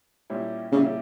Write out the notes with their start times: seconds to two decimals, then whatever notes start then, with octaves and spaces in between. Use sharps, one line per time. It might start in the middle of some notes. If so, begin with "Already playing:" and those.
0.30 A#2 G3 C#4 E4
0.72 A#2 C#3 G3 C#4 E4